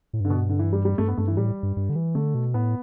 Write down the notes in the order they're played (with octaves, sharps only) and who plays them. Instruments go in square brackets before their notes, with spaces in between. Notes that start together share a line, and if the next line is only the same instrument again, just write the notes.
[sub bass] A2
[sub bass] G2 [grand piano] D3
[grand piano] B2
D3
E3
G3
G3
[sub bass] G2 [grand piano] A3
[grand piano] B3
[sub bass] G2 [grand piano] A3
[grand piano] E3
[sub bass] A2 [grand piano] G3
[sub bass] G2
G2
D3
E3
[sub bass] D3 [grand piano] A3
[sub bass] B2
[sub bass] A2 [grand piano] B3